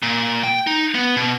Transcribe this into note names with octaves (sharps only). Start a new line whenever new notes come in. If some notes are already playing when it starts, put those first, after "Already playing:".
A#2
G5
D#4
B3
B2